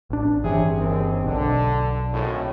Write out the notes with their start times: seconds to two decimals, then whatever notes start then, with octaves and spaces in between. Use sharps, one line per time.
0.10 A1 D4
0.44 G1 C3 E3 C#4 G#4
0.78 D#2 D#3 C4
1.24 B1 B2 D3
2.12 G#1 A2